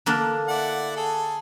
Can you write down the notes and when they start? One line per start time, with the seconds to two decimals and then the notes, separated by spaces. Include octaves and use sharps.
0.06 D3 A#3 D4
0.48 E4 D5 F#5
0.97 G#4 A4